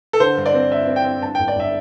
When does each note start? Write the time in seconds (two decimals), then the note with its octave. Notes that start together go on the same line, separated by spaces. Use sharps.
0.13 A4
0.20 D3 C5
0.37 G2
0.46 D5
0.54 C4
0.71 G2 E5
0.88 C4
0.96 G5
1.05 C4
1.21 G2 A5
1.35 G1 G5
1.48 D5
1.55 G1 E5